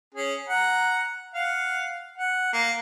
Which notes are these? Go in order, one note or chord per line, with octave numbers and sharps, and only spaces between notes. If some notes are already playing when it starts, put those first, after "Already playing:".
C#4 G#4
F#5 A#5
F5 F#5
F#5
A#3